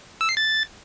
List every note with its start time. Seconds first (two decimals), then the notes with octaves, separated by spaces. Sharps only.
0.21 E6
0.29 C7
0.37 A6